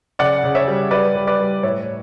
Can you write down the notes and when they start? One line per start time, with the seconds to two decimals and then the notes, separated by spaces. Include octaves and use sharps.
0.19 C#3 D5 F#5
0.44 C#3
0.55 C#5 E5
0.68 G3
0.91 G3 B4 D5
1.16 G3
1.27 B4 D5
1.40 G3
1.63 A2 C#5 E5